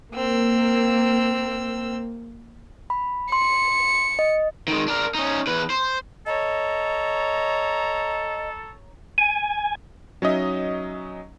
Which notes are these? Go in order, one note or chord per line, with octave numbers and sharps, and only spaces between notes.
A#3 C4 E6
B5
C6 C#7
D#5
D#3 G#3
D4 A#4
C#4 D#4
E2 B4
C5
A4 C#5 D#5 A#5
G#5
F#3 C#4 D#4 D#5 E5